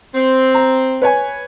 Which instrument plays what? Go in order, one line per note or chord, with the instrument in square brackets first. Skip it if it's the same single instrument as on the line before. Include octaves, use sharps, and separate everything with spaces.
[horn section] C4
[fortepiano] A#5
B4 C#5 G#5